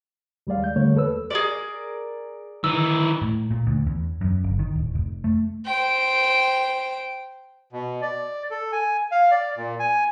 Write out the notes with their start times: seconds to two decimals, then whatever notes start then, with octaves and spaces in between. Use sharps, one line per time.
0.47 D#2 G3 G#3 D5 F5
0.64 G6
0.76 D3 G3 A3 A#3 C#5
0.95 E2 A4 B4 E6
1.30 G#4 A#4 D5
2.64 D#3 E3 D#4 E6
3.22 A2
3.51 A#2
3.67 D2
3.86 E2
4.21 F#2
4.44 G1
4.59 D#3
4.75 D1
4.95 F1
5.24 A3
5.66 C5 G5
7.73 B2
8.02 D5
8.51 A4
8.72 G#5
9.12 F5
9.31 D5
9.57 A#2
9.80 G#5